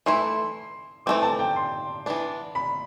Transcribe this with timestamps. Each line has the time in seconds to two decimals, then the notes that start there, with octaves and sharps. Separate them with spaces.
0.06 E3 A3 E4 C6
1.06 E3 A3 C4 D6
1.22 A5
1.39 G5
1.56 C6
2.06 E3 B3 D4
2.55 B5